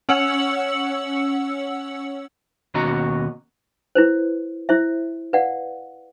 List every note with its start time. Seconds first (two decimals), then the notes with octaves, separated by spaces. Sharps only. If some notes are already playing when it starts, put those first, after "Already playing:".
0.09 C#4 C#5 F#5 E6 C#7 F#7
2.74 D#2 B2 C#4 F#4 D#5 A#5
3.95 E4 B4 C5
4.69 E4 C5 E5
5.33 B4 D5 F5 F#5